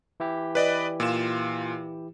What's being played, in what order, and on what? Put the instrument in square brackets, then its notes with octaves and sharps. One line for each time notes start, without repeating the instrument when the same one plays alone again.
[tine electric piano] E3 E4 G4
[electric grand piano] B4 D5 D#5
A#2 F4 E7